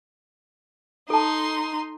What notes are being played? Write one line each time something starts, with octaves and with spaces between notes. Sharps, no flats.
D#4 A4 A5 C6